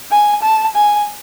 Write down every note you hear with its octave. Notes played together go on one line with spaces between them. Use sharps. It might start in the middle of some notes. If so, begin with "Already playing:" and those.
G#5
A5
G#5